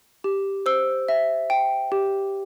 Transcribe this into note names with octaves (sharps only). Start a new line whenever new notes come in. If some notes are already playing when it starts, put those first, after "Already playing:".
G4
C5 E6
E5
G5
G4